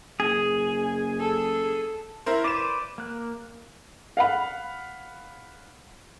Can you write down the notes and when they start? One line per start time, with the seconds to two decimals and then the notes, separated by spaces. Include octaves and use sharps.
0.20 F#1 G#4
1.20 A4
2.26 E4 A#4 C5
2.44 B4 C5 D5 D6 E7
2.98 A#3 F#6
4.17 F5 F#5 B5